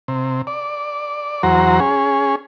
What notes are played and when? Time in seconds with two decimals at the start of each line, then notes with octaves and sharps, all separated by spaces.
0.08 C3
0.47 D5
1.43 E2 F#3 F#4 C5 A#5
1.80 C#4 G#4